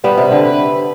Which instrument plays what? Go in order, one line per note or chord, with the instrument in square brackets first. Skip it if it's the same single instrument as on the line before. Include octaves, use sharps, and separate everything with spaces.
[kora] G3 B3 [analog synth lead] B4
[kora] C3
D3
[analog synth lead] B4